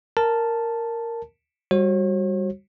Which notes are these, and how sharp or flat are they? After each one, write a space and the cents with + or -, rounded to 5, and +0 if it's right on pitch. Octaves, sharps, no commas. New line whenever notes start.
A#4 -10 A5 +0
G3 +10 F#4 +0 C#5 -45